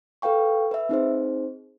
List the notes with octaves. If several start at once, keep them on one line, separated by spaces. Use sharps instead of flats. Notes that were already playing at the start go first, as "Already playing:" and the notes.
A4 B4 F5 G5 C#6
B4 E5
C4 D#4 G#4 C5